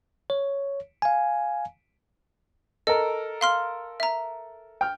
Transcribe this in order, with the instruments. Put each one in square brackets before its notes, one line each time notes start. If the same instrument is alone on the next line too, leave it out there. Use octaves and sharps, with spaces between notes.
[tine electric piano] C#5
F5 G#5
[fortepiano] A4 A#4 [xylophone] D#5
[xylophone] F5 C6 F6
E5 A#5
[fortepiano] G5 F6